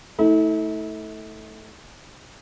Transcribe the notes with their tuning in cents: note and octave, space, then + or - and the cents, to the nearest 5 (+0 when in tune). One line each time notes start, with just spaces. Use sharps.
A3 +0 E4 -40